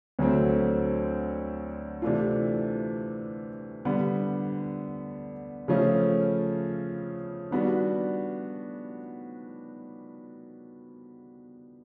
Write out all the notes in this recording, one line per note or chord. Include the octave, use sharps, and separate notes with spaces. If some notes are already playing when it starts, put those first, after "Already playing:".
D2 D3 F#3 A3 C4
C3 E3 A3 D4 F4
D3 G3 B3
C#3 F3 A3 C#4
D#3 G3 B3 D4 F#4